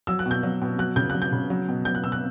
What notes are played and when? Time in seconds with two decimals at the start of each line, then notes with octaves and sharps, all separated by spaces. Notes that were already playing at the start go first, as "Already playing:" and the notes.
0.07 F#3 E6
0.19 F#6
0.26 B2
0.31 G6
0.43 F#3
0.62 B2
0.79 F#3 F#6
0.96 C#3 G6
1.10 F#3 F#6
1.22 G6
1.32 C#3
1.50 F#3
1.68 B2
1.85 F#3 G6
1.95 F#6
2.03 B2 E6
2.12 F#6